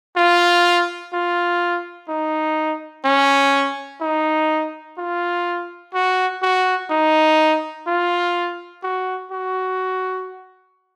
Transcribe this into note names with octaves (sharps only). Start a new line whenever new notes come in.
F4
F4
D#4
C#4
D#4
F4
F#4
F#4
D#4
F4
F#4
F#4